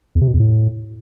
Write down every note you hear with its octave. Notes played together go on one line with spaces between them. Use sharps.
E2
C3
B2
E2
A2